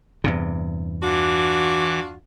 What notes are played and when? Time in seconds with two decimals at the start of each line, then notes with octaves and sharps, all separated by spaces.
0.24 E2 G2 C3
1.02 E3 D4 F4 F#4 D6